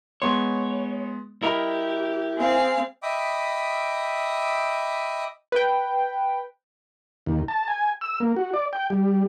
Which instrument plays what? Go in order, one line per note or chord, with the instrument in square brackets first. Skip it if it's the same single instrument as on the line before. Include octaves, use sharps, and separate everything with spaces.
[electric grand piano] G#3 B3 C6 [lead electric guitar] C#5
[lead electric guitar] E4 A#4 [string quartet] G4 [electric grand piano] D#5 B5 F6
[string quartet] C4 G#4 F5
[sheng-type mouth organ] D#5 E5 G5 B5 D6 D#6
[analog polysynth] B4 G5
[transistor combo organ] D#2
A5
G#5
E6
A#3
F#4
D5
G5
G3